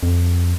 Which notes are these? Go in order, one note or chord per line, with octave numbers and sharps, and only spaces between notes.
F2